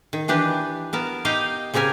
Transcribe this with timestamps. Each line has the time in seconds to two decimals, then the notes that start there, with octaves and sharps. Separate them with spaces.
0.13 D#3
0.28 E3 D4 G4 B4
0.93 B3 A#4 A5
1.25 D#4 G4 D#5 F5 G5
1.74 C#3 C4 G4 A#4 G#5